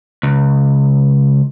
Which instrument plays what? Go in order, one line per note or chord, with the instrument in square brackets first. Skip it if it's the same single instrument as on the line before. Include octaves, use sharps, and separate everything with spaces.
[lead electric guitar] C#2